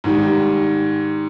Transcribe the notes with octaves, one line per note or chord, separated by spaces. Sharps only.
G#2 D#3 G3